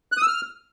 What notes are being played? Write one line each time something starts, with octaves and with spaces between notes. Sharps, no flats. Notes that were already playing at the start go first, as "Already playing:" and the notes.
F#6
D#6
E6
F6